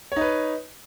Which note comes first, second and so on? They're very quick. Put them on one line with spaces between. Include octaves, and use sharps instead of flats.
C#5 D#4 B4